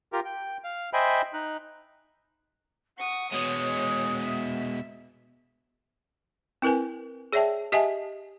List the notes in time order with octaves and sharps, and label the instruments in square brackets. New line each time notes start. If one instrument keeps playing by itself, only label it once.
[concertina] F4 G4 A#4
G5
F5
C5 D#5 E5 G5 G#5 B5
D#4 F#6
[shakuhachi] F#5 [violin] C#6 D#6
[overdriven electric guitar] B2 G#3 [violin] C#5 [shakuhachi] D#6
[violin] E5
[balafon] C4 E4 A#4 B4 G#5
G#4 C#5 D5 E5 G5 A5
G4 D#5 E5 F#5 G#5 A5